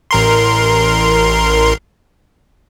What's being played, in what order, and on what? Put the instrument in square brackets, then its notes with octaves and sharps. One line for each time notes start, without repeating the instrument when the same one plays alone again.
[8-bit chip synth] A1 A#4 C6